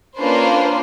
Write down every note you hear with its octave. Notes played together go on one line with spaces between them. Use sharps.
A#3 C#4 D4 F4 B4 C5